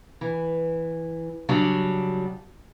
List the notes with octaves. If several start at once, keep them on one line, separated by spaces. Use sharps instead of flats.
E3
C#3 F#3 G3 D4